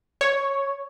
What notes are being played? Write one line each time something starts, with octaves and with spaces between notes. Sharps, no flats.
C#5